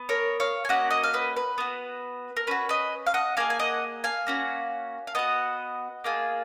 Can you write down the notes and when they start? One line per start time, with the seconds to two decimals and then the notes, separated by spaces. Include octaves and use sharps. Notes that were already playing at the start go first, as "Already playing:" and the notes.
Already playing: B3
0.09 A#4 C#5
0.40 C#5 F5
0.65 G#5
0.69 A#3 C#4 F#4 D#5 F#5
0.91 D#5 F#5
1.04 F5
1.14 B4 D#5
1.36 B4
1.58 B3 F#4
2.37 A#4
2.47 C#4 F#4 B4
2.69 B4 D#5
3.07 F5
3.14 D#5 F#5
3.37 A#3 F4 G#4 F5 G#5
3.50 G#5
3.59 D#5 F#5
4.04 F5 G#5
4.27 A#3 C#4 F#4
5.07 F5
5.15 B3 F#4 D#5 F#5
6.04 A#3 F4 G#4